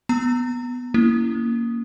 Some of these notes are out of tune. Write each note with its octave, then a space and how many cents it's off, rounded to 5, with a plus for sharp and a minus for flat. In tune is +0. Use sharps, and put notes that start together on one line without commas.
B3 +0 A#5 -25
A#3 +0 C#4 +10 E4 +5